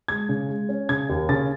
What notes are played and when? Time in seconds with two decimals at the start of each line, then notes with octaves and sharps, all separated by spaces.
0.08 G#3 G#6
0.29 C#3
0.49 G#3
0.69 C#4
0.89 C#3 G#6
1.09 D#2
1.29 C#3 A6